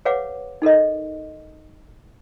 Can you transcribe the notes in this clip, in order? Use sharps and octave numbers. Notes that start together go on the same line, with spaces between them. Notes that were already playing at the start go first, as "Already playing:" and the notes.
G#4 B4 C#5 F5 F#5 D6
D#4 A4 A#4 D#5